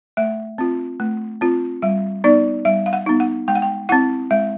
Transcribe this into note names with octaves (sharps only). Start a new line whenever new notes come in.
A3 E5
C4 F4
A3
C4 F4
G3 E5
B3 D#4 D5
G3 E5
F5
F#5
B3 D#4
F#5
G#3 G5
F#5
G5
C4 E4 F#5
G#3 E5